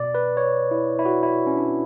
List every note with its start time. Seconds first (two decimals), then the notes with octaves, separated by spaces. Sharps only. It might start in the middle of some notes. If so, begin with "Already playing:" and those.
Already playing: B2 D5
0.15 B4
0.37 C#5
0.71 E4
0.99 E4
1.05 F#4
1.23 E4
1.47 C#4
1.57 D4